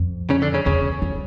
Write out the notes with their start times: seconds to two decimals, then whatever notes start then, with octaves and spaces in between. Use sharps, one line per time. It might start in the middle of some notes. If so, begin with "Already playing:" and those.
Already playing: F2
0.30 C#3 C#4
0.42 D3 D4
0.54 C#3 C#4
0.66 E2 C#3 C#4
1.02 F2